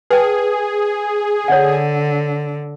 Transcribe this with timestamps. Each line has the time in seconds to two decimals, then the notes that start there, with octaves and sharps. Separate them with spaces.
0.11 G#4 B4 G5 A5
1.48 D3 C#5 D5 F#5